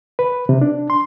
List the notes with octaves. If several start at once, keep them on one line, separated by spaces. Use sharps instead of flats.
B4
C3
D4
C6